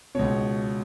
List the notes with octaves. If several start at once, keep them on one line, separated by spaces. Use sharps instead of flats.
C#2 B2 C#5